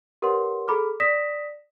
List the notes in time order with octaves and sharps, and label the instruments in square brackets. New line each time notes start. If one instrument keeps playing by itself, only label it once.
[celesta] G4 A#4 B4 C#5 F#5 C6
G#4 A4 A#5 B5 D6 F6
D5 D#6 A#6 B6 E7